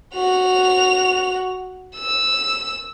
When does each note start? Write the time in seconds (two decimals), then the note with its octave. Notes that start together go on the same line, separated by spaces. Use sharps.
0.15 F#4 F7
1.95 E6